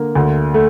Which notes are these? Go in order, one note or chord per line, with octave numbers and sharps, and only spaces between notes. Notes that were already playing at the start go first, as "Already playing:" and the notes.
Already playing: D3 A#3
D2
A3